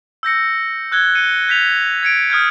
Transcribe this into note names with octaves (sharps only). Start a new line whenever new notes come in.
E6 G6 A#6 C#7
E6 F#6 G#6 G7
C#7 D#7 G7
F#6 G6 B6 F7
G#6 C#7 D7
D#6 F6 G6 G#6